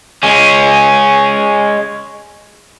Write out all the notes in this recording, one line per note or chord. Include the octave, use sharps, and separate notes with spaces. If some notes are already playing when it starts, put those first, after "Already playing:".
G#3 C#4